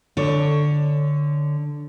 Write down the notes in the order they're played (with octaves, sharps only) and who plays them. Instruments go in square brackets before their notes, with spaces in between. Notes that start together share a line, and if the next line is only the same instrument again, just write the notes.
[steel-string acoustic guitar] D3 C#5